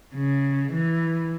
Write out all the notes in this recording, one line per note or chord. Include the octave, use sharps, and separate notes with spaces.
C#3
E3